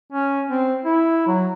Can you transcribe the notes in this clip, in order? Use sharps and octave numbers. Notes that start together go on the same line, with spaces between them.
C#4
C4
E4
F#3